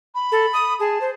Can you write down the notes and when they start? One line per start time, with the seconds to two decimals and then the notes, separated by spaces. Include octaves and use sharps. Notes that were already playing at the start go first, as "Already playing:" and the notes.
0.15 B5
0.32 A4
0.53 D#6
0.80 G#4 A5
1.01 C5